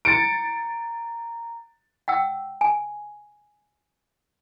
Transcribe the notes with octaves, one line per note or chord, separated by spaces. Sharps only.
A#5 A6 C#7 D7
F#5 G5 E6
G#5